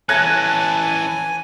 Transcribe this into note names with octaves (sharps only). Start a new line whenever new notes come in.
E3 C#4 G#5 A5 F#6 G#6 A#6